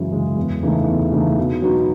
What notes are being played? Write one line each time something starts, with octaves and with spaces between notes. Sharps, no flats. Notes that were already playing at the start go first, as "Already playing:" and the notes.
Already playing: F#2 C#3 E3 G#3
C#3 E3 G#3
E2
C#3 E3 A3 D#4
E2
C#3 E3 A3 D#4
B2
F#3 B3 D#4 F#4